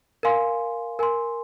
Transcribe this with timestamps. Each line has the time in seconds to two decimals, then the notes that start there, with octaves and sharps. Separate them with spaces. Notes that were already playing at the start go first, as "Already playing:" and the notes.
0.23 A#4 F5 G#5 C6
0.99 A#4 G#5 C6